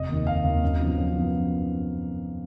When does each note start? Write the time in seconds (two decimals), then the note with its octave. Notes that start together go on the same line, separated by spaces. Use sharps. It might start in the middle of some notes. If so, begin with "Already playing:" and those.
Already playing: F1 D#5
0.09 D#2 D#3
0.27 F1 F5
0.44 D#2 D#3
0.63 F#2
0.80 F3 B3 D#4
0.97 F#2
1.15 F3 B3 D#4